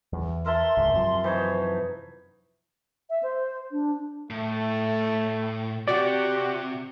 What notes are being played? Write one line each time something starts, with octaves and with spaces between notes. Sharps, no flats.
E2
A#4 E5 A5 C6
D1 C#2 G#2
F#2 C3 F3
E3 D#4 C5 C#5
E5
C5
D4
A2 A3
C3 F#4 G4 D5